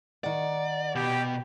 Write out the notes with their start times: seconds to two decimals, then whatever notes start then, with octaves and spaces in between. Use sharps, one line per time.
0.24 D#3 D5 F#5
0.95 B2 G4